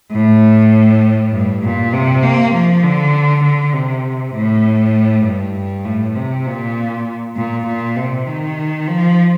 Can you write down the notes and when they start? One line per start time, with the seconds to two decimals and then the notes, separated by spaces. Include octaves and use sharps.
0.12 A2
1.32 G2
1.63 A#2
1.93 C3
2.23 A#3
2.54 F3
2.83 D3
3.44 D3
3.74 C3
4.34 A2
5.24 G2
5.85 A2
6.15 C3
6.46 A#2
7.36 A#2
7.66 A#2
7.96 C3
8.26 D#3
8.87 F3